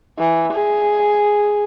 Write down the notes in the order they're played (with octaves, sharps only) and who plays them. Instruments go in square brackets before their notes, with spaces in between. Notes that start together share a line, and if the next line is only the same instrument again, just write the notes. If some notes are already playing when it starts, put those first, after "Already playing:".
[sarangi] E3
G#4